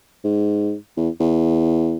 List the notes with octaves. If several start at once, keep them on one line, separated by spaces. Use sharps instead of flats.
G#2
E2
E2